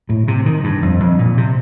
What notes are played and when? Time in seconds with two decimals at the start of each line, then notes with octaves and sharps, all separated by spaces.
0.09 A2
0.28 C3
0.46 D#3
0.64 G2
0.82 F2
1.00 F2
1.19 A#2
1.37 C3